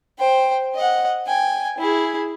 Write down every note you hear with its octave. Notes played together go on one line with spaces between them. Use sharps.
C5 G5
D#5 F#5
G5 G#5
E4 G#4